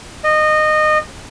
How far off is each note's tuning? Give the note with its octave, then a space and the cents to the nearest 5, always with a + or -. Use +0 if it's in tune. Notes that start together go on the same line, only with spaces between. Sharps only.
D#5 -20